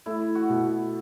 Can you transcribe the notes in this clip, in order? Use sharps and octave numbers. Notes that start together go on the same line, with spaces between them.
A3 E4
F#4
B2